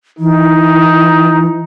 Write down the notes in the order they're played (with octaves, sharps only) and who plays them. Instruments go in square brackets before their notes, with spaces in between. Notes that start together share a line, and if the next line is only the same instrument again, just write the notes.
[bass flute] E3 [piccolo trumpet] D#4